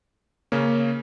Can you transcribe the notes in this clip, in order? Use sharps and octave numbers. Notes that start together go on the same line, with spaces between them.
C#3 A#3 C#4